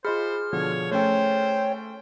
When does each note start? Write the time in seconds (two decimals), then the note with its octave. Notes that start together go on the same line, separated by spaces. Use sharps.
0.05 F4 G#4 C5 D#5 B5 F6
0.53 B2 D3 F3 C#5
0.91 A3 C#4 A4 C5 C#5 G5